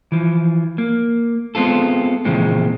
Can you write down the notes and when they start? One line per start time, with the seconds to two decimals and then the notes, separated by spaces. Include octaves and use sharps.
0.12 E3 F3
0.78 A#3
1.55 G#3 B3 C4 F4 A4
2.25 A#2 C#3 E3 F3 G#3 C4